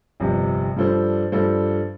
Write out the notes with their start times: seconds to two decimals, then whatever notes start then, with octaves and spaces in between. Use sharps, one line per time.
0.20 G1 F2 C3
0.77 G2 F3 D4 A4 C5
1.32 G2 F3 D4 A4 C5